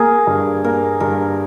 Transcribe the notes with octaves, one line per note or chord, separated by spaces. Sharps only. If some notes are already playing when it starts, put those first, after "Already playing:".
Already playing: A#3 G#4 A#4
G2
A#3 A#4
G2 A#4